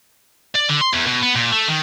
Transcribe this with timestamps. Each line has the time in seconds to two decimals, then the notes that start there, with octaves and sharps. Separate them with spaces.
0.56 D5
0.70 D3
0.81 C6
0.94 E2
1.06 B2
1.22 B3
1.35 A#2
1.52 A3
1.68 D#3